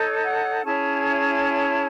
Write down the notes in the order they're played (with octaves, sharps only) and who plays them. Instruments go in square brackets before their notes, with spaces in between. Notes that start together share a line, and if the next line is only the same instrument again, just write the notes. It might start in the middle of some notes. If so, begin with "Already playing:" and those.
Already playing: [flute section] D#4 A4 C#5
F#5
C#4 E4 G#4 C#5 A5